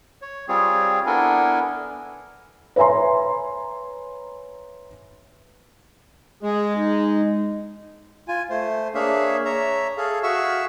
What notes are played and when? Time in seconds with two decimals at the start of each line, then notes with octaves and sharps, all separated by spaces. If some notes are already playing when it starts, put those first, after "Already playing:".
0.22 C#5
0.48 G3 C4 F4 G#4 C#5
1.06 B3 D4 E4 A4 A#4 G#5
2.76 B4 C#5 E5 G#5 A#5 C6
6.43 G#3 G#4
6.77 D#4
8.28 F4 G#5
8.50 A3 C5
8.94 A#3 D4 G#4 C#5 E5 F5
9.45 C#5 E5 A#5
9.97 G#4 A4 F5
10.23 F#4 G#4 E5 F5 C#6 E6